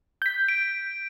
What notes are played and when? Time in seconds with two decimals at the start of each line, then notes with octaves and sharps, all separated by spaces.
0.22 G6 B6
0.49 D7